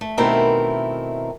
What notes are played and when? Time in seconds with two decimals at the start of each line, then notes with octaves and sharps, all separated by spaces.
0.01 A3
0.17 B2 D#3 A3 C4 E4 A#4